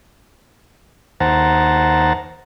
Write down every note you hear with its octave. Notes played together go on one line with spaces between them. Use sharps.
D#2 C5 F#5 A5 A#5